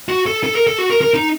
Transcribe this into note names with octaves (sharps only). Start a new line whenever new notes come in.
F#4
A4
A4
A#4
A4
F#4
A#4
A#4
D#4